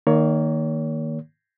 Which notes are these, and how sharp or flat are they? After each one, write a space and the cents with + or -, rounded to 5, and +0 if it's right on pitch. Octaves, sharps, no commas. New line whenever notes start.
D#3 -5 A#3 +0 C#5 +30